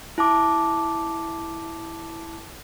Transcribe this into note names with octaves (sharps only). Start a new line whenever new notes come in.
E4 A5 D6